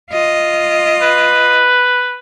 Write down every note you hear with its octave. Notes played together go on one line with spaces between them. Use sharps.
F4 D#5
B4